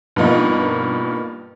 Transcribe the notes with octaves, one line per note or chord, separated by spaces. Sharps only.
G2 B2 F3 A#3 D#4